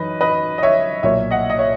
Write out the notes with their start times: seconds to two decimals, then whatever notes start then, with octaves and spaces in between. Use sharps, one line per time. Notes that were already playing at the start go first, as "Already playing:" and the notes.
Already playing: F#2 E3 D#4 B4 D#5
0.21 B4 D#5
0.58 D#5
0.62 C#5 E5
1.03 B1 A#2 A#3 C#5 E5
1.31 D#5 F#5
1.50 D#5
1.58 C#5 E5